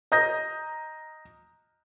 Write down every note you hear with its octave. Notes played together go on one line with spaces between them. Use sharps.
D#5 A#5 D#6 G6 A#6